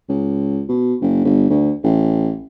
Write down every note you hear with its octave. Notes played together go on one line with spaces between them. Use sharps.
C#2
B2
F#1
G1
D2
A1